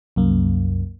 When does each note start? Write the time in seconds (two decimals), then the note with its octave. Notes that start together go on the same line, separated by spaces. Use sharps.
0.16 C2 F#2 A#3